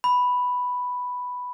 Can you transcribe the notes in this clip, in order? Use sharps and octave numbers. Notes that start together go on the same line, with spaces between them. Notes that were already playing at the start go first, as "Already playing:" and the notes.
B5